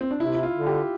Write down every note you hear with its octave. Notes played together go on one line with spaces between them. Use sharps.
C4
D4
C3 E4
E4
F4
D3
G4